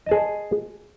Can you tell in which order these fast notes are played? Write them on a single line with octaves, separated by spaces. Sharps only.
D#5 A5 G#4